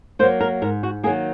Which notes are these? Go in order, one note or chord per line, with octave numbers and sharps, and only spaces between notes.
F#3 A#3 C5
A#4
G#2 A#4
F#4
D#3 F#3 A#3 G#4